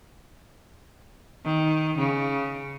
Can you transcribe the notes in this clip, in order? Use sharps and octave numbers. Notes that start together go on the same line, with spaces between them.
D#3
C#3